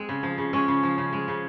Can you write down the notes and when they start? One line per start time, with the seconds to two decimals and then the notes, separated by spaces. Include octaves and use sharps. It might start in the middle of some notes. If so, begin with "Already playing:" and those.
Already playing: G#3 C4
0.09 C#3
0.23 F3
0.38 C#3
0.53 G#3 C#4
0.68 C#3
0.83 F3
0.98 C#3
1.13 G#3
1.28 C#3